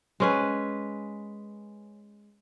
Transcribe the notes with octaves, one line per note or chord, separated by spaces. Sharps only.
G#3 C#4 B4